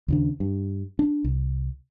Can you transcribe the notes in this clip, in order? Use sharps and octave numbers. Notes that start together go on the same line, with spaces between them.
D#2 C#3 D4
G2
D4
C2